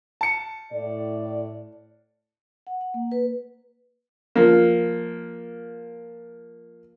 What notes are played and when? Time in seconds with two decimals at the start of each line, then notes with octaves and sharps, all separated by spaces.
0.21 A5 C#7
0.73 A2 D5
2.67 F#5
2.81 F#5
2.94 A#3
3.12 B4
4.36 F3 A#3